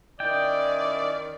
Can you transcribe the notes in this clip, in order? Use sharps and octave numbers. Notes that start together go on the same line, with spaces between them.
D#3 C#4 E4 D5 D#5 G5